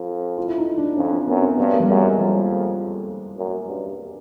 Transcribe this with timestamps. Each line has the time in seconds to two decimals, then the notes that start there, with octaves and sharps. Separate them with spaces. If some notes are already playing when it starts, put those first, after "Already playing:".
Already playing: F2
0.38 F4
0.48 E4
0.58 D#4
0.78 D4
0.97 F2 C#4
1.13 C4
1.27 F#2 B3
1.42 C4
1.57 G2 B3
1.73 A#3
1.80 G3
1.87 F#2 G#3
2.03 G#3
2.17 F2 G3
3.37 F#2
3.68 G2